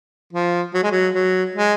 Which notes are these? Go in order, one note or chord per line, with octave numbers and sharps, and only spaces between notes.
F3
F#3
G#3
F#3
F#3
G#3